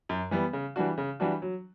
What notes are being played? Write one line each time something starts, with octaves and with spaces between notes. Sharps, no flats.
F#2
E3 G3 B3
C#3
E3 G3 D4 F#4
C#3
E3 G3 D4 F#4
F#3